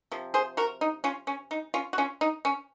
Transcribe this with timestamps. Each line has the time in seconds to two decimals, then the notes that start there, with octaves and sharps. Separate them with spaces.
0.12 C3 F3
0.34 G#4 C5
0.57 F#4 A#4
0.81 D#4
1.04 C#4 F4
1.27 C#4
1.51 D#4
1.74 C#4 F4
1.93 F#4
1.98 C#4 F4
2.21 D#4
2.45 C#4